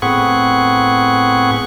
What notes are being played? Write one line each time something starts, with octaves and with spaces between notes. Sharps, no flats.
A2 B3 C4 G#4 F#5 C#6